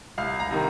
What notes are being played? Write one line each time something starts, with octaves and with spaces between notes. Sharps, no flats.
C2 F5
A#5
C3 D#3